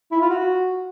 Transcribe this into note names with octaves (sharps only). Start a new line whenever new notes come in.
E4
F4
F#4